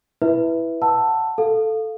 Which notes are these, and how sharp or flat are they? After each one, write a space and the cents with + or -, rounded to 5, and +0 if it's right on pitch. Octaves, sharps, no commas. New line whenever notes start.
E4 +0 B4 +0 E5 +0
F#5 +0 A5 +10 E6 +5
A4 +0 F5 +0